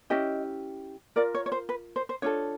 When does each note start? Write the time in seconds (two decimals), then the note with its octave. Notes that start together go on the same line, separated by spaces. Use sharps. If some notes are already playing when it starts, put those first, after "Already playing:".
0.10 C#4 E4 G4 D#5
1.16 F4 A#4 D5
1.35 C#5
1.46 C#5
1.52 C5
1.69 B4
1.96 C5
2.09 C5
2.22 D4 F4 A4 C#5